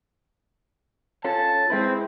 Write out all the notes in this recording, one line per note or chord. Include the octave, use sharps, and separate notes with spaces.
C#4 F4 A4 A5
G#3 C4 E4 B4